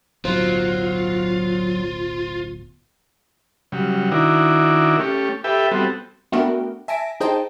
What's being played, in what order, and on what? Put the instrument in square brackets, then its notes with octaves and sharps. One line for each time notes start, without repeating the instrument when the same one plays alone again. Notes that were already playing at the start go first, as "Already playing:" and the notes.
[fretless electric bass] D1 B1 [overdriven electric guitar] F#3 [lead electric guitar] F4 [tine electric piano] C5
[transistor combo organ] C#3 F#3 G3
D#3 D4 E4 F#4 A#4
A3 C#4 G4
G4 A4 B4 E5 G5
G3 B3 C4 F#4 A4
[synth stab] A3 B3 D4 F#4 A#4 G5
E5 G#5 A5 A#6 B6 D7
D#4 G#4 C5 D#5 G5 A5